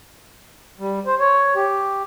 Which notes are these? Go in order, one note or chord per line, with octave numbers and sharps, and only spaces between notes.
G3
C5
C#5
G4